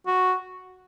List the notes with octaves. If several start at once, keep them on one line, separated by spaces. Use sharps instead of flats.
F#4